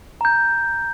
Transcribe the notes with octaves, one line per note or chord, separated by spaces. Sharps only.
A#5 G6